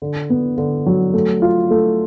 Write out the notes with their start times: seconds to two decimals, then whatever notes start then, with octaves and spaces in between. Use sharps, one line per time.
0.02 D3
0.30 B3
0.58 D3
0.86 F#3
1.13 A3
1.42 F4
1.71 A3